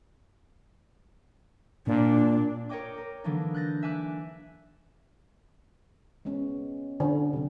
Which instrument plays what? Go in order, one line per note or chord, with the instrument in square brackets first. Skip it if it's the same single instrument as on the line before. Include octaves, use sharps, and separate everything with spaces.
[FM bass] A#2 [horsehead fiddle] D4
[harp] A#4 C#5 D#5 G5 D6
A#4
D3 E3 F#3 A#3 D4 D#4
F#6 G6 A6 A#6
E5 G#5 D6 F#6
[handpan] G#3 B3 C#4
[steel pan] D3
[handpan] C3 F#3